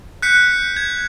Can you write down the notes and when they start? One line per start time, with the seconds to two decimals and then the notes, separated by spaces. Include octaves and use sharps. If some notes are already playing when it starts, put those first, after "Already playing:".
0.22 F#6 G6 B6 C#7
0.76 G#6